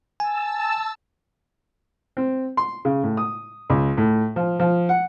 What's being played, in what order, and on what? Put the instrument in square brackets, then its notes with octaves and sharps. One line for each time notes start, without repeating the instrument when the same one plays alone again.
[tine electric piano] G#5 [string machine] A5 E6
[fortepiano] C4
C6
C#3
A2
D#6
C#2
A2
F3
F3
F#5